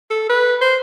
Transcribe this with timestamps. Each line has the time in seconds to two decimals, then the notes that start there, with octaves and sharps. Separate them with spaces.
0.10 A4
0.29 B4
0.61 C5